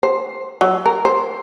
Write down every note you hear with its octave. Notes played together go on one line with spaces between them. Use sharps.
C5
F#3
A#4
C5